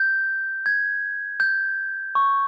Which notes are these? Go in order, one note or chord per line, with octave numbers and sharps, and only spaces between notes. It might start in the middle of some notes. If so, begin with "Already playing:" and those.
Already playing: G6
G#6
G6
C#6